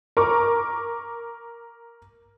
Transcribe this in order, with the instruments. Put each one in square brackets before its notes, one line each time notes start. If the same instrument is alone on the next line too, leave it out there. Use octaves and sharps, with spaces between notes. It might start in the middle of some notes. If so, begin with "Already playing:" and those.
[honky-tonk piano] A#4 C#6 D6